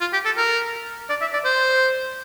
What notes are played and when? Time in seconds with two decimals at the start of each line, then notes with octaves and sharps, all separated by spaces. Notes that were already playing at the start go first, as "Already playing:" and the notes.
0.01 F4
0.13 G4
0.26 A4
0.37 A#4
1.10 D5
1.21 E5
1.33 D5
1.45 C5